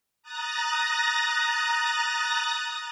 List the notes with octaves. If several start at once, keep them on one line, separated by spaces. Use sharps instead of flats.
A#5 D#6 F#6 A6 A#6